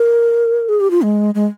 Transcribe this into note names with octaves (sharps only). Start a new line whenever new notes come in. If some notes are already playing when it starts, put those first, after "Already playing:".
Already playing: A#4
G#4
G4
F4
G#3
G#3